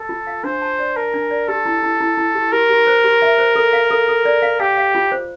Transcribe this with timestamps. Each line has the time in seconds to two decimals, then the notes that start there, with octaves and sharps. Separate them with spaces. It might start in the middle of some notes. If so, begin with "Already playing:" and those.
Already playing: A4
0.09 F4
0.27 F5
0.44 D4 C5
0.62 A5
0.79 D5
0.96 A#4 A5
1.14 D4
1.31 D5
1.48 G4 A4
1.65 E4
1.83 E4
2.00 E4
2.17 E4
2.35 G4
2.52 G4 A#4
2.69 G4
2.87 C5
3.04 G4
3.22 E5
3.38 C5
3.56 A4
3.73 F5
3.90 A4
4.08 A4
4.25 D5
4.42 F5
4.60 G4 F5
4.77 F5
4.95 F4
5.12 C5